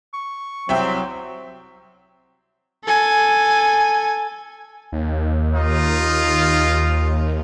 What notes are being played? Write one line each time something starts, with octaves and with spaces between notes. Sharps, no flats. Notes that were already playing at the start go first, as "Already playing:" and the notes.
C#6
C2 F#3 C4 E5 G5
A4 G#5
D#2
D#4 F4